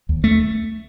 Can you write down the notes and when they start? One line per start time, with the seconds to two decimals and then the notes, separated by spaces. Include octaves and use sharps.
0.09 D#2
0.24 A3